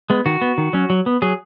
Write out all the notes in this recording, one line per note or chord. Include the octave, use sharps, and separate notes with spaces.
G#3 B3
D#3 F#4
B3
D#3
F#3 C#4
F#3
B3
F#3 G#4